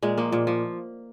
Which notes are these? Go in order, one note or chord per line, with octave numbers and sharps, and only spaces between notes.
A#2 G#3
F3 A#3
A#2
F3